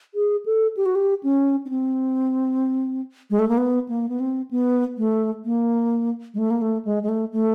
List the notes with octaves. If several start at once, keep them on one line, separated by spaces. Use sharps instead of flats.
G#4
A4
G4
F#4
G4
C#4
C#4
C4
G#3
A3
A#3
B3
A#3
B3
C4
B3
A3
A#3
G#3
A3
A#3
A3
G#3
G#3
A3
A3